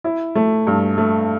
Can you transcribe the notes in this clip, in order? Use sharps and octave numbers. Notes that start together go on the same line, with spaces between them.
E4
A3
G2
A3